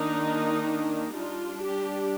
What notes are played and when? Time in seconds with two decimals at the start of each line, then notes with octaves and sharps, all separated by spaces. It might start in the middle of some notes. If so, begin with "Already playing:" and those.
Already playing: D#3 A#3 D4 D#4
1.16 G3 D4 F4
1.61 G4